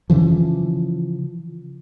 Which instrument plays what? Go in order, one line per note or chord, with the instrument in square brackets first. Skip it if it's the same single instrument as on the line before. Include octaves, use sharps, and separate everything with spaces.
[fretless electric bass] C#3 E3 F3